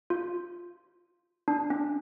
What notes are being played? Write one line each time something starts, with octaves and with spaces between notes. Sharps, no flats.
F4
D4
C#4